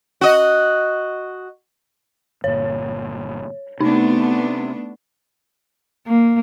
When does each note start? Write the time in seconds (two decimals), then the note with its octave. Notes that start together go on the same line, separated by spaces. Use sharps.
0.21 F#4 D#5
2.44 G1 A#2 C#5
3.80 C3 A3 B3 D4 D#4
6.06 A#3